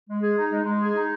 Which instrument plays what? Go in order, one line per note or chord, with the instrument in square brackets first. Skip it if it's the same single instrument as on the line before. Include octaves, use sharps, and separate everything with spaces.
[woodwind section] G#3
G#4
D#4
G#3
G#3
G#4
D#4